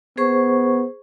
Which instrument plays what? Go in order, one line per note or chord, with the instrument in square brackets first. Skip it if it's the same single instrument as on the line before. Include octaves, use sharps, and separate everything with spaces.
[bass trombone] B3 [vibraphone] G#4 C5 C#6